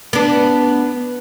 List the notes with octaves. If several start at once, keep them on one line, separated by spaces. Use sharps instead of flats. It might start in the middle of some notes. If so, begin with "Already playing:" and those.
B3 D4